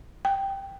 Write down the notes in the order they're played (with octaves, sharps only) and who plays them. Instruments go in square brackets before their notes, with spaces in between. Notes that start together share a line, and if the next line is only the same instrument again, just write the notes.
[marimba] G5